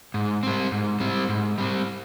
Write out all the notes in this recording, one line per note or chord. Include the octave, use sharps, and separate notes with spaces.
G#2
G3 C4
G#2
G3 C4
G#2
G3 C4